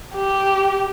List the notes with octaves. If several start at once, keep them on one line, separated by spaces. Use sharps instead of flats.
G4